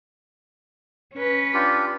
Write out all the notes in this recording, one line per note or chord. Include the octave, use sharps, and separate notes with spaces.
C#4 B4
D4 F4 G4